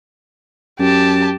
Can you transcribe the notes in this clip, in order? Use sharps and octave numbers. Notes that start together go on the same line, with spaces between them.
F#2 G4 A5